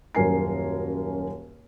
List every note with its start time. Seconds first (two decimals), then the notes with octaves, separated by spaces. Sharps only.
0.15 D#1 F#2 A#4 G#5 C7